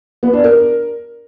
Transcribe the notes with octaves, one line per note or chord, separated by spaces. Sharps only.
B3
D4
A#4